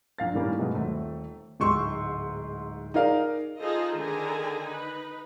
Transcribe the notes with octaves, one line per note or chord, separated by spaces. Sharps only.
A#1 A#2 F5 A6
A2 D#3 G3 A#3 C#4
B2 F#3 G#3 A3 B3
D#1 A3 C4
D1 G#2 C6 C#6 E6
D#4 G#4 A#4 D5 F5
D#4 F4 G#4 A4 C5 D#5
D3 D#3 G#4 A4 G#5 A#5
D#4 B4